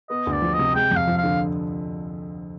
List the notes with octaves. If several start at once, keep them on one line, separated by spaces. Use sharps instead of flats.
B3 D#5
D2
D5
F3
D#5
C3
G#3 G5
F2
F5
F3
F5
D3